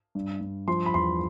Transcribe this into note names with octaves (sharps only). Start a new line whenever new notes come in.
G2
G2
F3 C6
B5
E2 C6